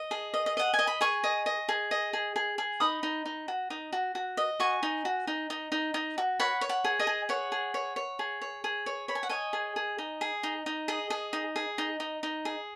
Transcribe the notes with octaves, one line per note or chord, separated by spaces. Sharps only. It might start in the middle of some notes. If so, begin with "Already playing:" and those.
Already playing: D#5
G#4
D#5
D#5
D#5 F#5
G#5
D#5
B5
G#4 G#5 C#6
D#5
D#5
G#4
D#5
G#4
G#4
G#4
D#4 B5 D#6
D#4
D#4
F#4
D#4
F#4
F#4
D#5
F#4 G#5 C#6
D#4
F#4
D#4
D#4
D#4
D#4
F#4
C#5 F#5 B5
C#5
F#5
G#4
D#5 G#5
G#4
C#5 F#5
G#4
C#5
C#5
G#4
C#5
G#4
C#5
C#5 B5
G#5
F#5
C#5 D#5 G#5
G#4
G#4
D#4
G#4
D#4
D#4
G#4 D#5
G#4
D#4
G#4
D#4
D#4
D#4
G#4